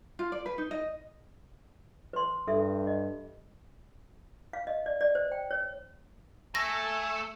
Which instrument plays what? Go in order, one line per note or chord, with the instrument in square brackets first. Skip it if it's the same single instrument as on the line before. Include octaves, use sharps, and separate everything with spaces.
[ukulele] F4
D5
B4
D#4
D#5
[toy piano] B4 C6
[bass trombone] G2 [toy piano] A4 E5
[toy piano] D#5
F5
D#5
D5
D5
C5
G5
C#5
[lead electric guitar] A3 [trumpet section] G#5 A5 [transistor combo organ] E6 [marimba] A#6